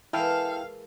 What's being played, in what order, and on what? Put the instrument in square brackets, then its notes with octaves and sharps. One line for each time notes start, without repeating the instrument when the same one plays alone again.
[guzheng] E3 G#3 A#3 [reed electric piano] E4 G5 F6 [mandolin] A4 [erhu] F5